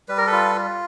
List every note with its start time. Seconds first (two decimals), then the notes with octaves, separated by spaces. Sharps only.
0.09 G3 B4
0.18 A#4
0.27 A4 B4
0.32 F4
0.55 F4